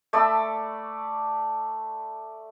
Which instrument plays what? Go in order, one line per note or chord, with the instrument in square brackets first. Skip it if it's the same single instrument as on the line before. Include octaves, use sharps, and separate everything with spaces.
[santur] A3 D5 B5 E6